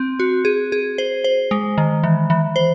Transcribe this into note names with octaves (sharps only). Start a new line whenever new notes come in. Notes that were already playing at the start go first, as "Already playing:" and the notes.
Already playing: C4
F#4
G#4
G#4
C5
C5
G#3
D#3
E3
E3
C5